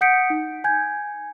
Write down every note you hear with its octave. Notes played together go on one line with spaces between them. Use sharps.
F#5 D#6 G6 B6 C#7 D7
D#4
G#5 G6 G#6